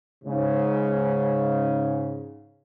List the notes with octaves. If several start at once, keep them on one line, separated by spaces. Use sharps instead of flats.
G#2 C#3